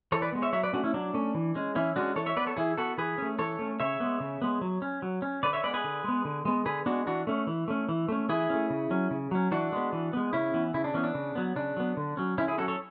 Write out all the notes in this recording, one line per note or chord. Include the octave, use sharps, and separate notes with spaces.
E3 A4 C#5
B4 D5
G#3 B3
C#5 E5
F#3 C#5 E5
B4 D5
A3 C#4 D4 F#4
C#4 E4
F#3 D4
A3 C#4
E3
G#3 C#4
E3 C#4 E4
G#3 C#4 D4 F#4
E3 A4 C#5
C#5 E5
B3 B4 D5
A4 C#5
E3 E4 G#4
B3 F#4 A4
E3 G#4 B4
A3 C#4
E3 A4 C#5
A3 C#4
C#3 C#5 E5
G#3 B3
C#3
G#3 B3
F#3
C#4
F#3
C#4
D3 B4 D5
C#5 E5
G#3 B3 B4 D5
G#4 B4
D3
G#3 B3
D3
G#3 B3
D3 G#4 B4
G#3 B3 D4 F#4
E3 D4 F#4
A3 C#4
E3
A3 C#4
E3
A3 C#4
E3 E4 G#4
A3 C#4
C#3
F#3 C#4
C#3
F#3 C#4
E3 D4 F#4
G#3 B3
E3
G#3 B3
C#3 C#4 E4
E3 B3
C#3 E4
D4
E3 B3 C#4
D4
C#3
F#3 B3
C#3 D4
F#3 B3
D3
F#3 C#4
D3 C#4 E4
E4 G#4
F#3 C#4 F#4 A4
A4 C#5